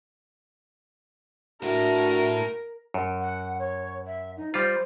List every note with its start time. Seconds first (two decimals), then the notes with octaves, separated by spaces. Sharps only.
1.63 A3 D4 E4 F#4 A#4
2.94 F#2
3.21 F#5
3.59 C#5
4.07 E5
4.37 D#4
4.54 G3 F4 C5